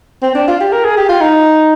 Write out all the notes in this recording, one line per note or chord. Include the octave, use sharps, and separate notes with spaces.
C4
D4
F4
G4
A#4
G#4
G4
F4
D#4